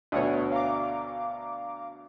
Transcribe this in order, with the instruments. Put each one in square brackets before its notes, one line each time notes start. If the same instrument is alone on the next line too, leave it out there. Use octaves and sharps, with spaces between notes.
[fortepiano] D2 B2 [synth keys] C#5 F#5 D#6
[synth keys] F5 A#5 D6